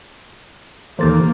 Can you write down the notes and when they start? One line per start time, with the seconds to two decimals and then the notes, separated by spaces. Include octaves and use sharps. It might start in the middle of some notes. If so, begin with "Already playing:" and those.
0.99 D#2 E3 A#3 A4 C5 A6